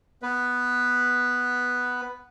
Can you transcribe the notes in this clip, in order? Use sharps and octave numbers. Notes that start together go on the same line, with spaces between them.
B3 B4